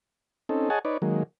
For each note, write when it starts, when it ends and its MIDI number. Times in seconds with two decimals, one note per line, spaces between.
0.49 0.69 60
0.49 0.69 61
0.49 0.69 63
0.49 0.69 69
0.70 0.79 68
0.70 0.79 73
0.70 0.79 75
0.70 0.79 78
0.70 0.79 80
0.70 0.79 81
0.85 0.97 63
0.85 0.97 71
0.85 0.97 73
0.85 0.97 74
1.02 1.23 51
1.02 1.23 54
1.02 1.23 56
1.02 1.23 58